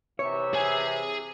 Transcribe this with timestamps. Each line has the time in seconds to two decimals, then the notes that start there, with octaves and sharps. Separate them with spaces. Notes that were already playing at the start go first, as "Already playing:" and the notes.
0.19 C3 E3 C#5 E5
0.53 G#4 G#5